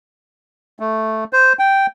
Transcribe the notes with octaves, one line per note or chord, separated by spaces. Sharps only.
A3
C5
G5